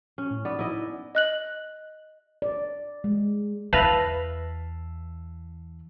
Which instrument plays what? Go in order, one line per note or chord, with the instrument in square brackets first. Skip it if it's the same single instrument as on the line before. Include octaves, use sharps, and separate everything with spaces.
[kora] C#4
[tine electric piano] A2
[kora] B3 [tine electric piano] D#4 D5
[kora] E4 D#5
[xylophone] D#5 F#6 F#7
[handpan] D5
G#3
[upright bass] E2 [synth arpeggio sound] B4 [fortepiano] E5 F5 A5 [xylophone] A#6 F7 F#7